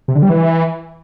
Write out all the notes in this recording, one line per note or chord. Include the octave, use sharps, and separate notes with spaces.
C3
D3
G3
E3